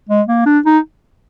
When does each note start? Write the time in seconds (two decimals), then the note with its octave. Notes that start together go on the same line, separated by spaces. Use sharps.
0.09 G#3
0.28 A#3
0.46 D4
0.65 D#4